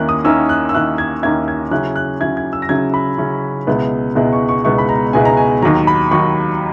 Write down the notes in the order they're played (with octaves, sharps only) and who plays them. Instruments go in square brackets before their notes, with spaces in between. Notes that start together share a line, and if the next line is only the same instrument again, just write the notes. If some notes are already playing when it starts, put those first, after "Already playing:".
Already playing: [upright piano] D#2 D#3 A#3 C#4 E4 F#6
D#6
D#2 D#3 A#3 C#4 E4 E6
F#6
E6
D#2 D#3 A#3 C#4 E4 F#6
G#6
D#2 D#3 A#3 C#4 E4 G#6
G#6
C#3 F#3 C#4 E4 F#6
F#6
C#3 F#3 C#4 E4 G#6
G#6
E6
A#6
C#3 F#3 C#4 E4 G#6
B5
C#3 F#3 C#4 E4
C#2 B2 G#3 B3 E4
C#2 B2 G#3 B3 E4
C#6
C#6
C#2 B2 G#3 B3 E4 C#6
B5
A#5
C#2 B2 G#3 B3 E4 G#5
A#5
G#5
D#2 D#3 F#3 A#5
B5
D#2 D#3 F#3 C#6